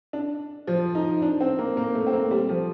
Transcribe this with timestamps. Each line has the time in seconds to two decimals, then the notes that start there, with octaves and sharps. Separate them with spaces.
0.13 D4
0.67 F3
0.95 D#4
1.22 D4
1.41 C4
1.59 A#3
1.77 A#3
1.95 A3
2.07 C4
2.13 A#3
2.31 G3
2.49 F3